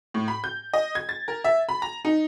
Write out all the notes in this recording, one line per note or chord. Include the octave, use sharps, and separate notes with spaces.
A2
B5
G6
D#5
G#6
A6
A#4
E5
B5
A#5
D#4